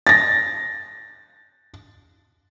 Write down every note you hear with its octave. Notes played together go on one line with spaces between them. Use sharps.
A6 A#6